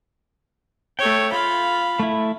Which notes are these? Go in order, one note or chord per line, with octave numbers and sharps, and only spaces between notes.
A3 C#5 G5
F4 F5 B5
A3 E4